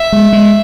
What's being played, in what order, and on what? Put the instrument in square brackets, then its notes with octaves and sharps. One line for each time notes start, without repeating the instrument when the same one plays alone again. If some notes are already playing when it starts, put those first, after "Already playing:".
Already playing: [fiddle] E5
[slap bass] G#3
G#3